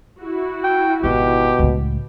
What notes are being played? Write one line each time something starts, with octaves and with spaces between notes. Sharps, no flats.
E4 F#4
G5
G#1 B2 D#4 G4
C#2 A2